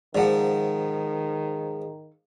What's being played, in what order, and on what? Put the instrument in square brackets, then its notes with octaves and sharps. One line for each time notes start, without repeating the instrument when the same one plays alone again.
[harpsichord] G#2 F3 [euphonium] D#3 [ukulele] D5 F#5